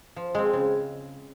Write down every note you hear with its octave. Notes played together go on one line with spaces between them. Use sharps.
F3
G#3 C4
C#3